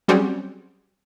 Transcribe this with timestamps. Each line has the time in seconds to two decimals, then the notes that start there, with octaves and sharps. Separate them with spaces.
0.08 F#3 G3 C4 C#4 F#4 G#4